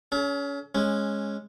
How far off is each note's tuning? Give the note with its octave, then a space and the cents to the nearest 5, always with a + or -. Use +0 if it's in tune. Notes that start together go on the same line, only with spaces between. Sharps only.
C#4 +25 A4 -40
G#3 +0 C#4 -15